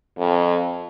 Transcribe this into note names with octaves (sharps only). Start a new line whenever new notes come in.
F2